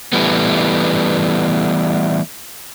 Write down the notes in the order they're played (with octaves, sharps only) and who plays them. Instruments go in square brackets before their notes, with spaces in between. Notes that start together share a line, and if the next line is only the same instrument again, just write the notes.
[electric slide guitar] E3 G3 A3 B3